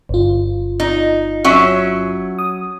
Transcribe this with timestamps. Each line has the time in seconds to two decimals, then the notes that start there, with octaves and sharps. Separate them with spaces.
0.09 G1 F4
0.80 D#4
1.44 F#3 C#4 E5
2.39 D#6